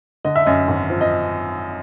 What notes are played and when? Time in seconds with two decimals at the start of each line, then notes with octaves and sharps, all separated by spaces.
0.25 D3 D#5
0.36 E5
0.46 F#2 D#5
0.68 G#1
0.90 F3
1.01 D#5